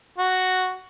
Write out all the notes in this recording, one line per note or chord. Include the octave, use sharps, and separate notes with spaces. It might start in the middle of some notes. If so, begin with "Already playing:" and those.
F#4